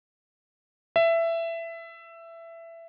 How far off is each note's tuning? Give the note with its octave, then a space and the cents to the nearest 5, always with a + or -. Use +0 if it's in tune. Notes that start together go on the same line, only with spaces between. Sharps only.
E5 +15